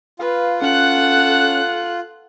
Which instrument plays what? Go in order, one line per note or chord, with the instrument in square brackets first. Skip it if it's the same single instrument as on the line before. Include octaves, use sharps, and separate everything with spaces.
[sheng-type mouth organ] F4 [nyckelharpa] B4 [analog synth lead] F5
[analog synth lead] C#4 [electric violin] A4 F#6 [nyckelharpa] F#5